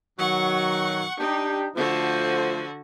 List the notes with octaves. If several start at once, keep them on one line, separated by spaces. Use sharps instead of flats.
B2 D#3 F#3 F#5 C#6
D4 D#4 G4
D3 F3 A3 F#4 C5